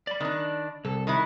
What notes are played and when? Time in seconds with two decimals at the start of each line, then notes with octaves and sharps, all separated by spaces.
0.07 D5 B5
0.20 D#3 D4
0.85 C2 A4
1.07 D#3 E3 E4